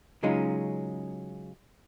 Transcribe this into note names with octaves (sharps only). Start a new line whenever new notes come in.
C#3 F#3 G#3 C#4 D#4 F4